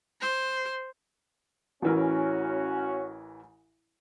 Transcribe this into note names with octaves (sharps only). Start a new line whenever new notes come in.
C5
A1 E3 C#4 F#4 A#4